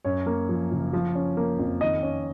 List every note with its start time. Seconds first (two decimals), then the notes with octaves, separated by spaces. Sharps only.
0.05 F#2 C#5
0.26 A#3
0.49 F3
0.71 F#1
0.93 F3
1.15 C#4
1.37 A#3
1.59 F2
1.81 D#3 D#5
2.03 C#4